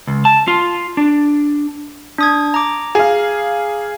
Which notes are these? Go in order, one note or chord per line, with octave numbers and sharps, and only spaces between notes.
C#2
A5
F4
D4
D4 D#6 G#6
A#5 D6
G#4 F5